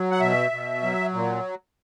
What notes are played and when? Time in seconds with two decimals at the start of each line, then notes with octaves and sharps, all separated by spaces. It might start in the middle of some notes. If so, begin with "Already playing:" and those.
Already playing: F#3
0.11 F#5
0.20 B2 E5
0.51 B2
0.82 F#3
1.13 A#2